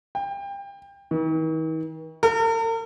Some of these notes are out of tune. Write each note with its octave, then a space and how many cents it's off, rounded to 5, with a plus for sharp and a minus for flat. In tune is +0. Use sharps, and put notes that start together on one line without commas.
G5 +25
D#3 +45
A#4 -45